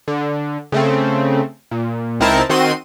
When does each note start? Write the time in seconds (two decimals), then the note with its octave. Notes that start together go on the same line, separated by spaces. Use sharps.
0.08 D3
0.72 C#3 A3 C4
1.71 A#2
2.20 C#2 C4 D#4 E4 A#4 A5
2.49 D#3 C4 F#4 C6 D#7